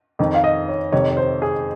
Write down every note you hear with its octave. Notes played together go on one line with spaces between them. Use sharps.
F2 D#3
F5
D#5
C#5
F2 C3 D#3 C#5
C#5
C5
G#4